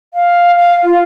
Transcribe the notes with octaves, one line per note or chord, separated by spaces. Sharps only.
F5
F5
F4